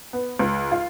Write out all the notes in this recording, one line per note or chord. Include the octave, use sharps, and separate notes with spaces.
B3
C#2
F4